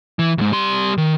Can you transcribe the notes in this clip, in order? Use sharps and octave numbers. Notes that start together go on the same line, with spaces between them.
E3
D2 G#2
G3 C6
D#3